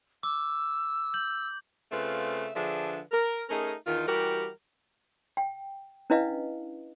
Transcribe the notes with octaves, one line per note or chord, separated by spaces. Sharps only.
D6 E6
G6 F#7
C#3 A3 C4 F4 B4 E5
D3 F3 D4 G#4 B4 E5
A#4
A3 C#4 D#4 G#4 A#4
E2 D#3 F4
E3 G3 F#4 G4 A#4
G5
C#4 D4 E4 B4 D#5 F5